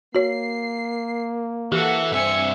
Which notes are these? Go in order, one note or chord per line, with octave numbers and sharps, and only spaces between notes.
A#3 F#4 C#5 C7
E3 F#4 G4 A4
G2 C4 E5 G#5 C#7